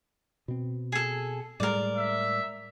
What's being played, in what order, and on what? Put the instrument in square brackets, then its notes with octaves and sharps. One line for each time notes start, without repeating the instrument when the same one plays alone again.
[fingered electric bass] B2 C4
[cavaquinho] G#4 A4
[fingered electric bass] A2 G3 G#3 [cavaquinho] A#4 D5
[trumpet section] E5